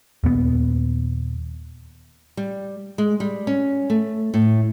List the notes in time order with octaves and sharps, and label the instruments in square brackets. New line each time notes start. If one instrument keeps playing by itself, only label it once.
[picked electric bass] D#2 A#2 B3
[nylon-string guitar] G3
G#3
G3
C#4
A3
A2